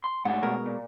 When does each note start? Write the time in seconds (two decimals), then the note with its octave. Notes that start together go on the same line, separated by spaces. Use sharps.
0.04 C6
0.25 G#2 C#3 A3 F#5
0.43 B2 G#3 A#4
0.66 A#2